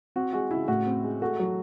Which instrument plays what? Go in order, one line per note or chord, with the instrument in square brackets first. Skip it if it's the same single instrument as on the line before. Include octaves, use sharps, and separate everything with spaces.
[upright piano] C4 F#4
G#3 F#4
C#3 E4
A2 F#4
C4
G#3
A3 F#4
F#3